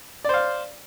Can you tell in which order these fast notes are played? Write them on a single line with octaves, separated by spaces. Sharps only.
D5 C5 F5